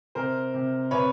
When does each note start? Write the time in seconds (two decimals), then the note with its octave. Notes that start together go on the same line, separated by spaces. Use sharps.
0.15 C3 A#4 C5
0.54 C3
0.91 C3 B4 C#5